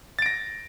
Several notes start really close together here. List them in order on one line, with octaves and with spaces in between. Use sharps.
A6 D7 A#6